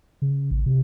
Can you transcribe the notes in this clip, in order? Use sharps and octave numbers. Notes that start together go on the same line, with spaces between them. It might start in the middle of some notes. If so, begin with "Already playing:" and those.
C#3
A1
C3